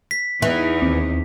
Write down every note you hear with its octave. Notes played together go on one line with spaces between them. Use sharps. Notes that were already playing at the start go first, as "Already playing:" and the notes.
B6
E2 E3 D#4
D#2 C4 D6